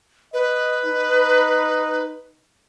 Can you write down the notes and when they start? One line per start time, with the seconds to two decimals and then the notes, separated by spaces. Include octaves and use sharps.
0.34 B4 D#5
0.85 D#4